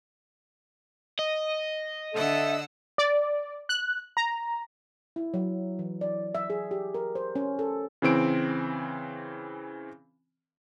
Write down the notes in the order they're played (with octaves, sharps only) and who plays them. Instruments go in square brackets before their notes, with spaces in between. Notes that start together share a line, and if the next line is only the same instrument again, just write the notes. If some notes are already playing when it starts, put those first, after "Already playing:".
[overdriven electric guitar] D#5
[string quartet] D3 F#5 E6 [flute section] A4 E5
[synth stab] D5
F#6
A#5
[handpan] E4
F#3
E3
D5
E5
G#4
G4
A#4
C5
C#4
A4
[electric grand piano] C#3 E3 C4 D7